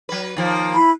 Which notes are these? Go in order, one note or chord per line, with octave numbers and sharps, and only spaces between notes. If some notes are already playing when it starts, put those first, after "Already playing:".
F#3 B4
D#2 F3 A#3
E4 B5